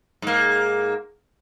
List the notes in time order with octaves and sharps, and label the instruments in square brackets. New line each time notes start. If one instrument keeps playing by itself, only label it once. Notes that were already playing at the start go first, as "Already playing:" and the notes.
[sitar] G#2 A#3